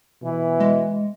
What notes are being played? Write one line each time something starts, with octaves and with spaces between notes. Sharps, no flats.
B2 E3
G#3